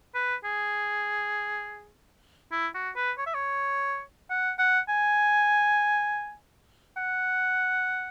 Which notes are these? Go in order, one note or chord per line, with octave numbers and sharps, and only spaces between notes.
B4
G#4
E4
F#4
B4
C#5
E5
C#5
F#5
F#5
G#5
F#5